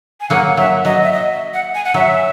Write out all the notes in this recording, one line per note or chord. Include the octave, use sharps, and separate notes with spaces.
G#5
F#3 A#3 F#5
F#3 E5
F#3 D#5
E5
D#5
E5
F#5
G#5
F#5
F#3 E5